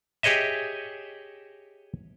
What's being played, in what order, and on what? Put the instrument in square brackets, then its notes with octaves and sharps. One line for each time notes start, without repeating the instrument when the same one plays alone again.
[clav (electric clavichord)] G4 G#4 C#5 D#5 E5